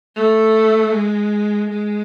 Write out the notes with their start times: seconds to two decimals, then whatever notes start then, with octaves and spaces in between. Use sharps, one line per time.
0.16 A3
0.92 G#3
1.69 G#3